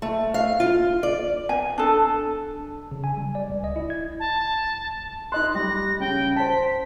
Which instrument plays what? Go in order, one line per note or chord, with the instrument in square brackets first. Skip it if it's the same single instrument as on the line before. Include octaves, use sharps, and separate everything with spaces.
[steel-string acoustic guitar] A3
F5
F4
D5
[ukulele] G#5
D4 A4
[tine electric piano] C#3
G#5
G3
D5
C#2
D#5
E4
G#6
[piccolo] A5
[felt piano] D#4 D#5 C6 [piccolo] F#6
[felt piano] G3 [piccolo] A#6
[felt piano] C#3 [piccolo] G5
[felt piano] C5 A5 [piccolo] B6